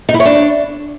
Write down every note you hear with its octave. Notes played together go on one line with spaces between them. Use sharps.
D#4
E4
C#5
D4